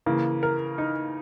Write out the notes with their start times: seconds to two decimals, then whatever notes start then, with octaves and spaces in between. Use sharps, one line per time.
0.06 C#3 E3 A#3
0.43 A#4
0.78 D#4